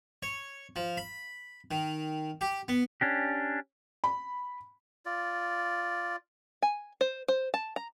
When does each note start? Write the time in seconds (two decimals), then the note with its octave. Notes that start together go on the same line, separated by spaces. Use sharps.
0.23 C#5
0.76 F3
0.97 B5
1.71 D#3
2.41 G4
2.68 B3
3.01 C#4 D4 G4
4.04 B5
5.06 F4 D5
6.62 G#5
7.01 C5
7.28 C5
7.54 A5
7.76 A#5